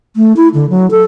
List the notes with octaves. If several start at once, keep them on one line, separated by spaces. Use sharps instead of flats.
A3
E4
D3
F#3
A4